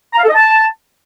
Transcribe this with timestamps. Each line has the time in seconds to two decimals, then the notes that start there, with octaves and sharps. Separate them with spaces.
0.13 A#5
0.19 F5
0.24 A4
0.29 D#5
0.34 A5